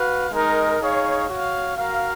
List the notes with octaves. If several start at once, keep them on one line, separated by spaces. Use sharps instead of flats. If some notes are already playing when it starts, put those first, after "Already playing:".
Already playing: F#4 B4 F5
G#3 D#4 A#4 D#5
D#4 G#4 C#5 F5
F#4 C#5 F5
F#4 A#4 F5